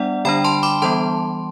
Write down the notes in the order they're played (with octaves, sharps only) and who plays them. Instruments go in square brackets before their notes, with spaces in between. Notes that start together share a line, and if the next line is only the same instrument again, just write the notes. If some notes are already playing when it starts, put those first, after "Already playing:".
Already playing: [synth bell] G3 B3 D4 D5 F#5
D3 G3 D4 G5 B5
A5 C6
B5 D6
E3 G3 B3 A5 C6